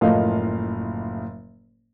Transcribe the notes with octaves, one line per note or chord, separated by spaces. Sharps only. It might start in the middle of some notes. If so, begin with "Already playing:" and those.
F#1 A2 F3 D#5 F5